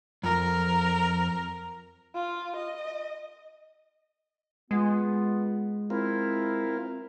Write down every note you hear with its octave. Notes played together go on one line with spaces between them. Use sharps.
F2 A#4
F4
D#5
G#3 B3 F4
C4 E4 F4 A#4